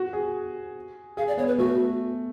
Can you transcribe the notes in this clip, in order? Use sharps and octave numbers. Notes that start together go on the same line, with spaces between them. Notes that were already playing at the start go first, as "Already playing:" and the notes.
Already playing: F#4
G#4
G#4 F5
D5
B3 C#5
B4
A3 F#4